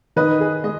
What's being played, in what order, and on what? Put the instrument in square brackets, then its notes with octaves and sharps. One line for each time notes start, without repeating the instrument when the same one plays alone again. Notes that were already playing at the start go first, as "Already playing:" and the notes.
[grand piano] D#3 [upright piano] B4 D#5
[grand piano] G#4
[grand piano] G#3 [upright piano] D#5